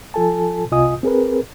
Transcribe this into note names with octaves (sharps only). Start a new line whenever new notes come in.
F3 F4 A4 G#5 A5
C2 C3 F4 D#5 G#5 D#6
C4 G#4 A#4 B4